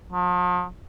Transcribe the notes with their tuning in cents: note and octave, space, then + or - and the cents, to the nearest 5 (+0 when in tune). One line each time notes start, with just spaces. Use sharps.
F3 +40